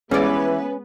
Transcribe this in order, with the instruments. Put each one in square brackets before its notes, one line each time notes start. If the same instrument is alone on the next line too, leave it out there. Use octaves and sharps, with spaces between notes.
[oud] E3 D5 [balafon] G#3 G#4 [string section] B3 B4 [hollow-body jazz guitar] C#4